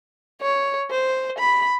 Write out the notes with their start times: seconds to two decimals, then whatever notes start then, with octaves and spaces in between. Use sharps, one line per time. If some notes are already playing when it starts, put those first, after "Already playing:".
0.42 C#5
0.91 C5
1.39 B5